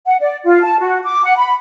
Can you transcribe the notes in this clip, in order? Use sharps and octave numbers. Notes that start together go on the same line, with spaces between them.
F#5
D5
F4
A5
F#4
D6
F#5
B5